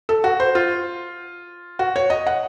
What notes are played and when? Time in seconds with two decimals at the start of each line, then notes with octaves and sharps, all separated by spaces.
0.09 A4
0.24 F#4
0.40 C5
0.55 F4
1.79 F#4
1.96 C#5
2.10 D#5
2.27 F#5